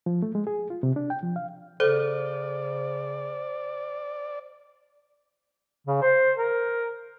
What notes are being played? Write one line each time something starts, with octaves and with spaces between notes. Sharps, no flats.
F3
A3
G#3
G#4
F4
C3
D4
G5
F3
F5
C#3 A4 C5 D5
C#3
C5
A#4